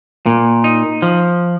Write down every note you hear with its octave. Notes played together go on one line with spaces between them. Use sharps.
A#2
D#4
F3